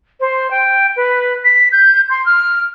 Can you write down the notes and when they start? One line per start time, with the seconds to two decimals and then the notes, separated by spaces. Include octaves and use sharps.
0.20 C5
0.51 G5
0.96 B4
1.44 B6
1.72 G6
2.10 C6
2.26 F6